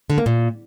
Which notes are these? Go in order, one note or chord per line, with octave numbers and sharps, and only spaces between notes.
D3
A#3
A#2